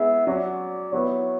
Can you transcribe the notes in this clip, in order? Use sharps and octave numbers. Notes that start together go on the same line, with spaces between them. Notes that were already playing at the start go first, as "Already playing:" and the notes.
Already playing: G#3 B3 E4 G#4 E5
F#3 C#4 F#4 D5
F#3 B3 E4 B4 C#5